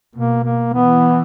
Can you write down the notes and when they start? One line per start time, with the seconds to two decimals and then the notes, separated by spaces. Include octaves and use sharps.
0.15 B2 A#3
0.44 A#3
0.73 E3 B3